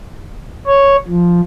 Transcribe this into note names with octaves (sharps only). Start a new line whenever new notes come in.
C#5
F3